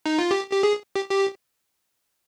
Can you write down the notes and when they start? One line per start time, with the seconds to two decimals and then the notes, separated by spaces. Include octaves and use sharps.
0.06 D#4
0.19 F4
0.31 G4
0.51 G4
0.63 G#4
0.96 G4
1.11 G4